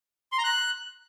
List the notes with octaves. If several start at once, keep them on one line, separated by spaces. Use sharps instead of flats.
C6
A#5
F#6